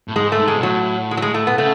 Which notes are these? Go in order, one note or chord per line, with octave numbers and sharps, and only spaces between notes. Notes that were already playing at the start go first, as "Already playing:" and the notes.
A2
G#2 G#3
A3
G#2
G#3
B2
A2 F#3
G#3
F#3
G#3
A3
B3
C#3 A3